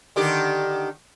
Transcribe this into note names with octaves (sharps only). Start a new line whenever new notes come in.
D3 D#3 G4